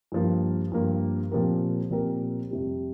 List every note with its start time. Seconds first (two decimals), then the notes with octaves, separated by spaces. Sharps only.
0.12 G2 F3 A#3
0.72 G2 F3 A#3
1.32 A#2 F3 C4 G4 A#4
1.91 A#2 F3 C4 G4 A#4
2.50 F2 C3 G3